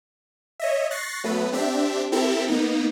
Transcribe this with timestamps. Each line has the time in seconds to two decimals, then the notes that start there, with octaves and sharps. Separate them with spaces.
0.60 C#5 D#5 E5
0.91 C#6 F#6 A6 A#6 C7
1.24 F#3 A3 B3 B4
1.52 C4 D4 G4 E5
2.12 C4 E4 G4 A4 A#4 E5
2.48 A#3 B3 D#4